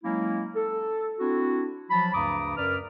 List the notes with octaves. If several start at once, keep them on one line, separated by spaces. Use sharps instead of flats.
F#3 G#3 A#3 C#4 E4
A4
C4 D4 E4 F#4
F3 F#3 A5 B5
D2 G2 C#3 A#5 D6 D#6
F#2 A#4 B4 D5 F6